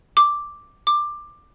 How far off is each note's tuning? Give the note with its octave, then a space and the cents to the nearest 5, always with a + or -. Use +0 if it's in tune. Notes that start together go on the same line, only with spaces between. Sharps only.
D6 +0
D6 +15